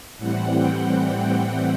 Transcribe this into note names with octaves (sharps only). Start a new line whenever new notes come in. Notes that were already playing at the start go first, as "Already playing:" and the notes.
A2 E3 G3 C4 F#5
G5
G5
F#5